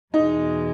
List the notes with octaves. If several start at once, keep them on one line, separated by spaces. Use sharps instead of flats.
E2 B2 G#3 D#4